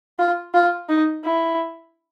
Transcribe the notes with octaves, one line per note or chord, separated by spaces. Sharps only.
F4
F4
D#4
E4